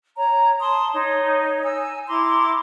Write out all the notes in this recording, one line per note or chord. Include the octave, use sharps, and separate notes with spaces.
C#5 A#5
A5 C6 D#6
D#4 C#5
G#5 E6
E4 A#5 C6 D6